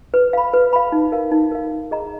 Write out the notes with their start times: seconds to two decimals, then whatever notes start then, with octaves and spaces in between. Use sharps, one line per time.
0.14 B4
0.33 F5 B5
0.53 B4
0.73 F5 B5
0.92 D#4
1.12 A#4 F5
1.31 D#4
1.51 A#4 F5
1.71 D#4
1.91 G#4 D#5 A#5